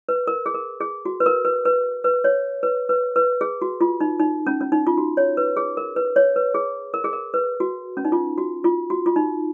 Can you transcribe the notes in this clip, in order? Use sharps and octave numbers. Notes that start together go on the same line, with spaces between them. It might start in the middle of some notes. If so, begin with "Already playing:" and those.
B4
A#4
G#4
A#4
G#4
F#4
B4
A#4
B4
B4
B4
C#5
B4
B4
B4
G#4
F#4
F4
D#4
D#4
C#4
C#4
D#4
F4
F#4
C#5
B4
G#4
A#4
B4
C#5
B4
G#4
A#4
G#4
A#4
B4
F#4
C#4
D#4
F4
F#4
F4
F#4
F4
D#4